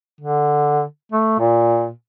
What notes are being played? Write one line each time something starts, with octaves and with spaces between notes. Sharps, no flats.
D3
A3
A#2